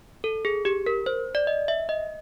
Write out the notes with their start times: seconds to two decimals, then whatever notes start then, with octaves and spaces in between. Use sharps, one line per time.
0.24 A4
0.45 G#4
0.65 G4
0.86 A#4
1.06 C5
1.35 D5
1.47 D#5
1.68 E5
1.89 D#5